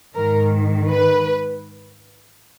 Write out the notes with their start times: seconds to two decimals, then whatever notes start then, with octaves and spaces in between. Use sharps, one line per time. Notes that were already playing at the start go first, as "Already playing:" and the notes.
0.15 G#2 D#3 A#4
0.88 B4